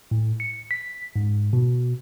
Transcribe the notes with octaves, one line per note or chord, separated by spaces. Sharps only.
A2
C#7
B6
G#2
B2